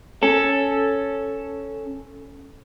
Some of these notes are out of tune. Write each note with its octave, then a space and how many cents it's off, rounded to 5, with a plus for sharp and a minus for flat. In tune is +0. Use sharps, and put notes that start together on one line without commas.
C#4 +0 A4 +0